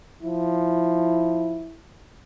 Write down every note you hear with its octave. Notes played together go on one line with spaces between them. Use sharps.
F3 E4